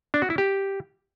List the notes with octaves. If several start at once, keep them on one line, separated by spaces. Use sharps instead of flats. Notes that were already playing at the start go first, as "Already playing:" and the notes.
D4
F#4
E4
G4